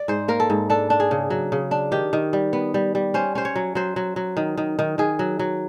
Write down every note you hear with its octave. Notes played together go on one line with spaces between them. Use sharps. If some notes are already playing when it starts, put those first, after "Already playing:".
Already playing: D5
G#2 C5
A#3 A#4
A4
G#2
D4 A4
D4
G#4
C#3
F#3
C#3
D4
D#3 G4
D#3
G3
B3
G3
G3
C#4 C5
C#4 C5
C#5
F#3
F#3 C5
F#3
F#3
D#3
D#3
D#3
D#3 G#4
F#3
F#3